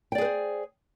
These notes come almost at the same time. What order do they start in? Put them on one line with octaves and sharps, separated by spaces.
G5 D5 G#4 B4 C5